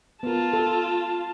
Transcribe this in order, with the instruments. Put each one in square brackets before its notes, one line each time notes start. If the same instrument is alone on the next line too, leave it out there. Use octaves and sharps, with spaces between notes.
[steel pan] B3 A#4 [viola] F4 A5
[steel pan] A4